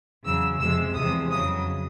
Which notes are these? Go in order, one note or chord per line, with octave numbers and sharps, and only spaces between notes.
E2 C#3 F#3 E6
F2 C3 F3 G#3 E6
E2 C3 F3 G#3 D#6
F2 C#3 F#3 D#6